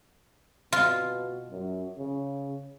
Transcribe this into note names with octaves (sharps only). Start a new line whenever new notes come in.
B2 F4
F#2
C#3